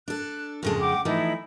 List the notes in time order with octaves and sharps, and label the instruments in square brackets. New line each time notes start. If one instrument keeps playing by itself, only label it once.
[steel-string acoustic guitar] D4 A4 [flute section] F#6
[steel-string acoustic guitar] F2 C#3 G#3 [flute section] A4
[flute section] F#5 G5 D6
[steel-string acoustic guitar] E3 F3 A3 [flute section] D#4 E4